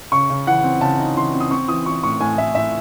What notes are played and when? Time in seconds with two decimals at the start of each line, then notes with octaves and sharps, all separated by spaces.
0.12 C#3 C#6
0.30 C#3
0.47 E3 F#5
0.64 C4
0.81 C#3 A5
0.99 D#4
1.16 E3 C6
1.34 C4
1.40 D#6
1.51 C4 C#6
1.68 E3 D#6
1.86 E3 C#6
2.03 A2 C#6
2.20 A2 G#5
2.37 A2 E5
2.55 A2 E5